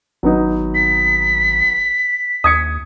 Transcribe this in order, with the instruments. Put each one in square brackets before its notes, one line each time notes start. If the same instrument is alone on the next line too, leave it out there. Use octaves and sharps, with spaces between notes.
[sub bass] G#1 [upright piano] F#3 B3 D#4
[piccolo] B6
[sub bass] D#2 [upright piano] D#6 G#6 C#7